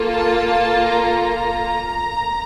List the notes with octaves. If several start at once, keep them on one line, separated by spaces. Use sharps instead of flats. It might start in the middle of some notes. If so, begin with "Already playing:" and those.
Already playing: A#3 F4 A4
A5
A#5